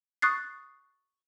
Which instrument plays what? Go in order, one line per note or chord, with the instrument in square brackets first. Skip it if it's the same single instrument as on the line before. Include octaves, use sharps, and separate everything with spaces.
[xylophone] C#6 D#6 F#6 A6 C7